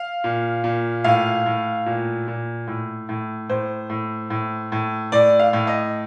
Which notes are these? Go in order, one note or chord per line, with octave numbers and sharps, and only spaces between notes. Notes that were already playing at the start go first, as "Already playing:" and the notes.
Already playing: F5
A#2
A#2
A2 F5
A2
A#2
A#2
A2
A2
A2 C5
A2
A2
A2
A2 D5
F5
A2
D#5